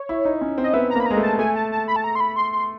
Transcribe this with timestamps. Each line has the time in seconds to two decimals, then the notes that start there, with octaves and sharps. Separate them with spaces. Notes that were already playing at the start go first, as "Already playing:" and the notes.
Already playing: C#5
0.09 E4
0.25 D#4
0.41 C#4
0.58 C4
0.63 D#5
0.74 B3 E5
0.90 A#5
0.95 A#3 B5
1.06 G#3 A#5
1.17 A3
1.23 A5
1.39 A3 G#5
1.56 A5
1.72 A5
1.88 B5
1.96 A5
2.04 A#5
2.15 C6
2.20 B5
2.36 C6
2.52 C6